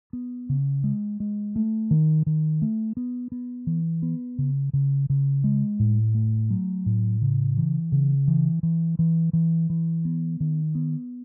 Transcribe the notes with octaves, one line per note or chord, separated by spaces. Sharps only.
B3
C#3
G#3
G#3
A3
D#3
D#3
A3
B3
B3
E3
B3
C#3
C#3
C#3
G#3
A2
A3
F#3
A2
C#3
E3
C#3
E3
E3
E3
E3
E3
B3
D#3
B3